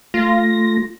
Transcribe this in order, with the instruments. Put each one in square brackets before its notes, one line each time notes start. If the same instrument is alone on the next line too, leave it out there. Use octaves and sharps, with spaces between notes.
[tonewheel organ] A3 A#6 [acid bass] F4